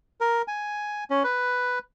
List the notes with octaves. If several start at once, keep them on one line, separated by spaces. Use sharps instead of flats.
A#4
G#5
C#4
B4